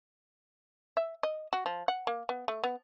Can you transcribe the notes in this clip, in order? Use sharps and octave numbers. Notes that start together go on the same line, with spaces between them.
E5
D#5
F#4
F3
F#5
A#3
B3
A3
B3